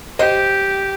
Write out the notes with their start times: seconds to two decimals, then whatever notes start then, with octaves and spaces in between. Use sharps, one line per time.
0.19 G4 C5 D#5